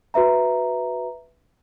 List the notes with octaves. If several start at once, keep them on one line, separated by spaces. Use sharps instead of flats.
F#4 B4 E5 A#5